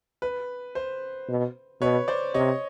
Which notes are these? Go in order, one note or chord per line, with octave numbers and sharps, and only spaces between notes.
B4
C5
B2
B2 B4 C#5
C5 D5
C3 C#5 D#5